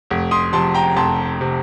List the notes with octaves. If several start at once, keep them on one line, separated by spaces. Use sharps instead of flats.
F1
C6 D#6
F2 C3 A5 C6
G5 A#5
F1 A5 C6
C3